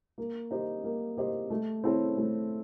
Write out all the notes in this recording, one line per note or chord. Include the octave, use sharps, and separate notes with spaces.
A#3
D#4 G4 C5 D#5
A#3
D#4 G4 C5 D#5
A3
C4 E4 A4 C#5
A3